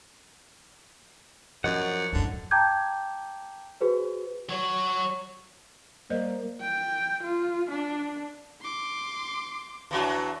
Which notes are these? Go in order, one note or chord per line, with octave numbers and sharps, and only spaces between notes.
F#2 F3 C#5 D#5 F#5
F#2 A2 D3
G5 A5 A#5 D6 G6 G#6
F#4 G#4 B4 C5
F#3 C#5
G3 A#3 C5 D#5
G5
F4
D4
C6 D6
E2 F#3 D4